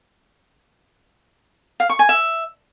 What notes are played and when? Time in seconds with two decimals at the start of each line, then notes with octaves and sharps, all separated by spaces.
1.80 F5
1.89 C#6
1.99 G#5
2.09 E5